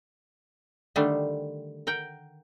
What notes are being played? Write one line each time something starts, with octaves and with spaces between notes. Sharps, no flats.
D3 D#3 G3 A3 D4
A#4 F#5 G5